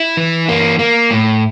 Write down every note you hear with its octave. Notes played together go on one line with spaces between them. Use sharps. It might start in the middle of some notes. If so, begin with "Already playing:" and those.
Already playing: E4
E3
A#3
A#3
A2